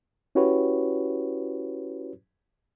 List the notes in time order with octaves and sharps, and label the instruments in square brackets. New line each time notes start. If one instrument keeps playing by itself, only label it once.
[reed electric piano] C#4 E4 F#4 G4 B4 C#5